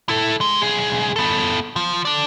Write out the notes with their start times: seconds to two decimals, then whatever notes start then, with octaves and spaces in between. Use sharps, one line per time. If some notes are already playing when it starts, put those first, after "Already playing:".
0.09 E4 A4
0.41 G#3
0.61 B1 G#4
1.16 B3 A4
1.76 F3
2.05 A4 D5